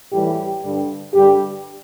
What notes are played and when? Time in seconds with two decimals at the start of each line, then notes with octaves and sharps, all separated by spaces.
0.11 A2 E3 G3 G4
0.62 G2 D3 G3
1.13 G2 D3 G3 G4